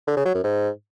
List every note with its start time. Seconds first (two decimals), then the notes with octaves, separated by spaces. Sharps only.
0.07 D3
0.16 C#3
0.26 F#3
0.35 F#2
0.44 G#2